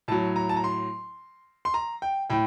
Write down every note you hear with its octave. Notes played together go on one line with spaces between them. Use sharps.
A2 F#3 A5
A#5
A5
A#5
C6
C6
A#5
G5
A2 G5